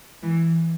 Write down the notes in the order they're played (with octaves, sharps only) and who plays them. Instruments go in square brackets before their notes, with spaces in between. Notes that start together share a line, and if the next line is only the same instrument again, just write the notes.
[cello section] E3